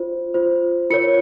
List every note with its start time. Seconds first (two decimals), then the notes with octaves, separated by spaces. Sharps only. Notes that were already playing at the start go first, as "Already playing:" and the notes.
Already playing: F4 C5
0.34 F4 C5
0.90 F4 A#4 C#5 C#7